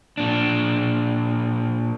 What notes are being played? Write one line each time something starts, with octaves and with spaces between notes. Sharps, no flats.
A#2 D4